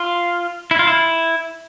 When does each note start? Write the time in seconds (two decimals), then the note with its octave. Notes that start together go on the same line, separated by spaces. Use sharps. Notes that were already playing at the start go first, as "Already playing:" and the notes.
Already playing: F4
0.71 E4
0.79 F4
0.87 E4